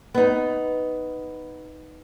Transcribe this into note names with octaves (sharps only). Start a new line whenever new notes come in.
B3 D#4